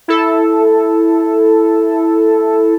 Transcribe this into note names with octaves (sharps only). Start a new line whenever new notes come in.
E4 A4